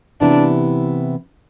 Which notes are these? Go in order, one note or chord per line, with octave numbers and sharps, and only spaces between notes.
C3 E3 B3 D4 E4